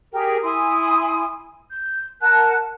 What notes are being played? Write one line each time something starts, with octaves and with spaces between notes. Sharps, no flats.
G4 G#4 A#4 G5
E4 G#5 C6 D#6
G6
A#4 F#5 A5 F#6